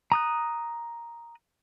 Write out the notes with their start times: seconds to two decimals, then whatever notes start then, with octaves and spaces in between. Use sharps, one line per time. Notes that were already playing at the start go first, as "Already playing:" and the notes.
0.12 A#5 D#6 F#6